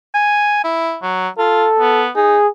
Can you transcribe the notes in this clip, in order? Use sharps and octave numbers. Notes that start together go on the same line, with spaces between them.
G#5
E4
F#3
F4 A4
B3
D#4 G#4